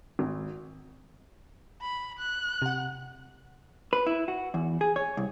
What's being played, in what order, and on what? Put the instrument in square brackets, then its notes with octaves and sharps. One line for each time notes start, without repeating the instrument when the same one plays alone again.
[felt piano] G#1
[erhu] B5
F#6
[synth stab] C3 F#5
[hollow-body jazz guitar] B4
E4
F#4
E2
G#4
C#5
C2